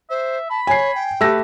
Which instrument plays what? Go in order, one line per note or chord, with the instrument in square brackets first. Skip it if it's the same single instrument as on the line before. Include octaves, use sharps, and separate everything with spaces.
[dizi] C5 [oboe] E5
[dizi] A5 [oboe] B5
[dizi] C#5 [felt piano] G#5 C7
[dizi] G5
[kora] A3 G4 [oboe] B4 [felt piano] E6 A#6